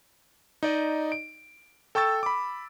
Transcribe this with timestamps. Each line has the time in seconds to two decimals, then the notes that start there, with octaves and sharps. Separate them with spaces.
0.63 D#4 D5 D#5
1.12 D7
1.95 A4 G5 C#6 E6 A6
2.23 B5 D6